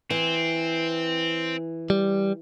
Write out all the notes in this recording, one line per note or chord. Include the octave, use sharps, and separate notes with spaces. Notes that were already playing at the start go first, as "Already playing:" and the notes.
E3 C4
G3